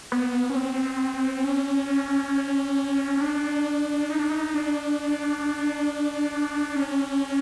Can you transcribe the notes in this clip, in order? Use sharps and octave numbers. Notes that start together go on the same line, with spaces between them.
B3
C#4
C4
C#4
C#4
D4
D#4
D4
D#4
D4
C#4